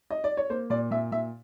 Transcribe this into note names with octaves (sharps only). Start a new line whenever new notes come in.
D#5
D5
C#5
A#3 C5
A#2 D5
A#2 E5
A#2 E5